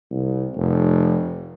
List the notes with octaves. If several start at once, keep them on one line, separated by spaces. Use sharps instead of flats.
C2
F1